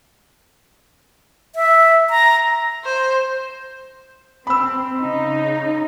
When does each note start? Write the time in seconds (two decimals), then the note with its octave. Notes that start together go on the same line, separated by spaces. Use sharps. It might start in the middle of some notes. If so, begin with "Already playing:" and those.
1.55 E5
2.10 A#5
2.85 C5
4.47 C4 B5 E6
4.99 C#3 D#4